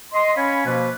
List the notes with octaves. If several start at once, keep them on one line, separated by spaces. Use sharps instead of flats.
D#5 C6
C#4 C#5 F5 G#5 B5
B2 F3 A#3 F4 B4 C5